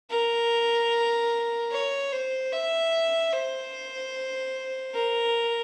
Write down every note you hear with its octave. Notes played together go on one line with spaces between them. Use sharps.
A#4
C#5
C5
E5
C5
A#4